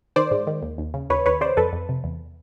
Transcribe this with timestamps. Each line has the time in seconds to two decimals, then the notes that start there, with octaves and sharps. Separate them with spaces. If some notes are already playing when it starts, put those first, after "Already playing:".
0.16 D#3 C5 D5
0.31 G#2
0.47 D#3
0.62 D#2
0.78 D#2
0.94 C#3
1.10 D#2 B4 C#5
1.26 D#2 B4 C#5
1.41 C#3 C5 D5
1.57 F2 A4 B4
1.73 F2
1.89 C3
2.04 E2